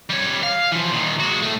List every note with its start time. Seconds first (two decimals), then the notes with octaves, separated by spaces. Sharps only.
0.10 G3 C#5
0.43 F5
0.72 E3 F3
0.91 A#2 D#3
1.20 G#3 F#4
1.42 A2 A3